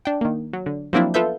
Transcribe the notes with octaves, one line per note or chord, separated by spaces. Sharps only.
D4 G5
D#3 A#3
F#3
D3
F3 F#3 A#3 C4 D4 E4
B3 F4 A4 B4 E5 G6